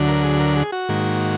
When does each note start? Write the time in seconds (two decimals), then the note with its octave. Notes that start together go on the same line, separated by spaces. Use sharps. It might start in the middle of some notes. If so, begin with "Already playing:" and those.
Already playing: D2 D3 F#3 D4
0.08 A#4
0.24 G#4
0.40 A#4
0.56 G#4
0.72 F#4
0.89 G#2 D#3 A#3